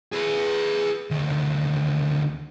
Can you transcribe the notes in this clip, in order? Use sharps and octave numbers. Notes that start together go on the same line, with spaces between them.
G#4 B4
D2 D#3